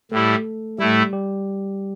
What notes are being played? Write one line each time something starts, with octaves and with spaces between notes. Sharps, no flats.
A2 G3 A3 E4 A4
A2 G3 A3 E4 G4
G3 G4